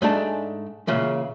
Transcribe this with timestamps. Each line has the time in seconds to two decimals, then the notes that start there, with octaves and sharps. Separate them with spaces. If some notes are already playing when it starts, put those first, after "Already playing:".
0.02 G#2 G#3 A3 D4 D5 A5
0.87 A#2 C#3 E3 G#3